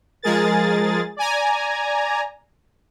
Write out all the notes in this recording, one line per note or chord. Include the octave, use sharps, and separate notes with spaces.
F3 G#3 G#4 A#4 A6
D5 G#5 A#5